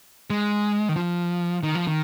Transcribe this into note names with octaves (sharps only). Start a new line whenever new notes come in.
G#3
D#3
F3
D#3
F3
D#3